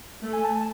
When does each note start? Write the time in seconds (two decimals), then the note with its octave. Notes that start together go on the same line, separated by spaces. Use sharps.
0.22 A3
0.33 G#5
0.44 A5
0.55 A5